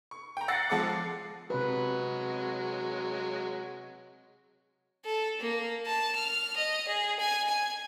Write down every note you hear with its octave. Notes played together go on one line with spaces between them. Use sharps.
C#6
G5 A#5
F#5 E6 A6 A#6 C7 C#7
F3 G#3 A4 F#5 D6
C7
C3 F#3 G#3 B4
A4
A#3
A5
F6
D#5
G#4
G#5
G#5